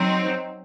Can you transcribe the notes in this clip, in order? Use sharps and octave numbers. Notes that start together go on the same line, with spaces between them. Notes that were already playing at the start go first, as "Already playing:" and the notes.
Already playing: F#3 C4 D#4